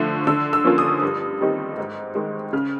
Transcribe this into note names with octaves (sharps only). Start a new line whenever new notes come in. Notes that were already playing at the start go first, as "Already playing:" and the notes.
Already playing: D3 F3 A3
D3 E6
E6
F3 A#3 C#4 F4
D#6
G2
D#3 G3 C4 D#4
G#2
D#3 G#3
C#3 F6